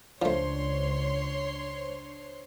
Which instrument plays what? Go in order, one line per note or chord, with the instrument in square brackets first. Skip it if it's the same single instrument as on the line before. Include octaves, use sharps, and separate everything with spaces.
[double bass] C#2 [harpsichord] F3 A3 [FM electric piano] D4 C5 [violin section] C#5 C6